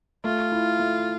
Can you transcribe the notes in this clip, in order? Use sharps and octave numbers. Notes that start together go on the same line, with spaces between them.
A3 F4
E4
A3